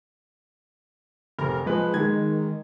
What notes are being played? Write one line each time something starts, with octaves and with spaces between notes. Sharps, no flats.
F1 A#4
F3 G#3 B4
D#3 G#3 G#6